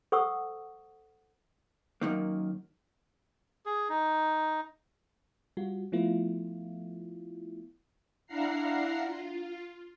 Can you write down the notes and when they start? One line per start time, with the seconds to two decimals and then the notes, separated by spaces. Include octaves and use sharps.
0.12 A4 C5 F#5 C#6 D#6 E6
2.01 F#2 D#3 A#3
3.66 G#4
3.89 D#4
5.57 G3 F4 F#4
5.92 F3 A3 B3 E4 F4
8.27 D4 E4 F5 F#5 A#5 C7
9.04 F4